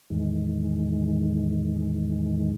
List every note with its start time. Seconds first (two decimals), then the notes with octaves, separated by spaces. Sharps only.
0.10 E2 A2 D#3 E3 G#3